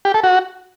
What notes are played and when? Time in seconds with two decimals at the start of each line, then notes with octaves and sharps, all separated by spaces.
0.05 G4
0.14 A4
0.24 F#4